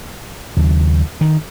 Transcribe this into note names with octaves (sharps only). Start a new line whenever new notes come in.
D#2 C#3 F#3
D#3